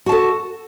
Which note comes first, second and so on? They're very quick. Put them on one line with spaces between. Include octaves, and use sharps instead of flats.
F#4 A5 A4